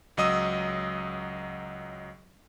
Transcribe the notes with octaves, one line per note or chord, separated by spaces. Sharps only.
C#2 F#3 D#5 D#6 E6